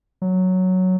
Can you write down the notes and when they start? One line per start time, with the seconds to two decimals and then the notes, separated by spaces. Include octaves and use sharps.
0.22 F#3